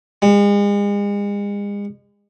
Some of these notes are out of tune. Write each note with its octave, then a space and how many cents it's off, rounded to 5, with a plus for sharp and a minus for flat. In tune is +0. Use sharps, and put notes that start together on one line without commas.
G#3 -40